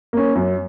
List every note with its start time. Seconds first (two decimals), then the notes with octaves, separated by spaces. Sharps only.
0.13 A#3 C#4
0.35 F#2